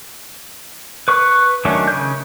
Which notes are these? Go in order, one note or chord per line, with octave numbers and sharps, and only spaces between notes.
B4 C#6 F#6
D#3 F#3 A3 C#4 D4
C#3 G6